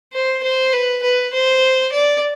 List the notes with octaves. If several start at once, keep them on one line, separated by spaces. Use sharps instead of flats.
C5
C5
B4
B4
C5
D5